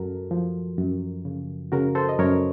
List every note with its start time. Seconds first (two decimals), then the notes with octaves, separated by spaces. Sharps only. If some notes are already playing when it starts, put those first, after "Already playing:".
Already playing: F#2 F#4 A4 A#4
0.31 F3
0.78 F#2
1.25 C#3
1.72 C#3 F#4 A#4
1.95 A4 C5
2.09 D#5
2.19 F#2 A#4 C#5